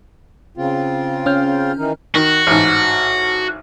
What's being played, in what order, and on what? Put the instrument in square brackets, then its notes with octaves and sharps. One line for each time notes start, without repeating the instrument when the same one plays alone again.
[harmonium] C#3 C4 F4
[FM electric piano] C#4 F6 G6
[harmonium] D#3 E3 D#4
[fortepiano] D#3 [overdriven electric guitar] F#4
[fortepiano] A1 G#2